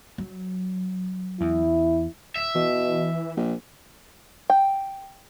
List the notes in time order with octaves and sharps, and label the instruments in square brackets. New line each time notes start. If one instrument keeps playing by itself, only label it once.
[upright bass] F#3
[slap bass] E2 [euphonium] E4
[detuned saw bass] D1 [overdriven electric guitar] E5
[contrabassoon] B2 [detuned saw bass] E3
[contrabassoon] A#1
[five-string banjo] G5